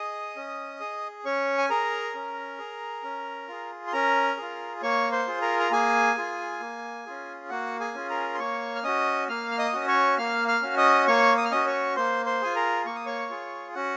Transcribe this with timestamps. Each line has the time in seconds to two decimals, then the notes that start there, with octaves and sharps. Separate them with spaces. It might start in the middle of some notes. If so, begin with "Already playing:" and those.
Already playing: G#4 D#5 D#6
0.36 C#4
0.80 G#4
1.25 C#4 C#5 C#6
1.58 G#5
1.70 G#4 A#4 A#5
2.15 C#4
2.59 G#4
3.03 C#4
3.48 F4 G#4
3.87 C6
3.93 C#4 A#4 A#5
4.37 F4 G#4
4.82 A#3 C#5 C#6
5.12 C5 C6
5.27 F4 G#4
5.42 A#4 A#5
5.60 A#5
5.71 A#3 G#4 G#5
6.17 F4 G#4
6.60 A#3
7.06 C#4 F4 G#4
7.50 A#3 F#4 F#5
7.80 G#4 G#5
7.94 C#4 F4 G#4
8.10 A#4 A#5
8.35 C6
8.39 A#3 C#5 C#6
8.75 F6
8.83 C#4 F#4 D#5 D#6
9.29 A#3 F5 F6
9.51 F6
9.58 D#5 D#6
9.73 C#4 F#4
9.88 C#5 C#6
10.18 A#3 F5 F6
10.48 F5 F6
10.62 C#4 F#4
10.77 D#5 D#6
11.07 A#3 C#5 C#6
11.37 D#6
11.45 F6
11.51 C#4 F#4 D#5 D#6
11.66 C#5 C#6
11.96 A#3 C5 C6
12.26 C5 C6
12.42 F4 G#4 G#5
12.55 A#4 A#5
12.86 A#3 C#6
12.95 D#6
13.06 C#5 C#6
13.30 F4 G#4
13.75 C#4 F#4 F#5